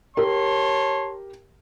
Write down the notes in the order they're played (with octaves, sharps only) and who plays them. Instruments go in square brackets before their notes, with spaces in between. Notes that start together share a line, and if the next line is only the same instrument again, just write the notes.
[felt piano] G4 A#4 [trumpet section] C#5 A5 C6